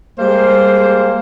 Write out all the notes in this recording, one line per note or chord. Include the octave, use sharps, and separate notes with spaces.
G3 G#3 A#3 C5